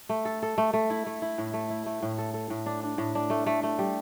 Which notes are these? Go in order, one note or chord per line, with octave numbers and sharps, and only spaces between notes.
A3
A4
A4
A3
A3
E4
A3
E4
A2
A3
E4
A3
A2
A4
A4
A2
D4
D4
A2
D4
A3
A3
A3
G3